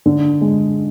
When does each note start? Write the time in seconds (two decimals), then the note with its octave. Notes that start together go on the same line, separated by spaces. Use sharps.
0.06 D3
0.41 G#3